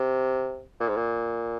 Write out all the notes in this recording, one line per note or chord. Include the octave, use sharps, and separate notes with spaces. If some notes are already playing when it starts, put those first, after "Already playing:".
Already playing: C3
A#2
G#2
A#2